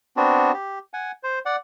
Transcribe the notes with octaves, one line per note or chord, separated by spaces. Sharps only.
B3 C4 D4 F#4
G4
F#5 G#5
C5
D5 F#5